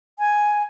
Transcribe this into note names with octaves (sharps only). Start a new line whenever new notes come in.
G#5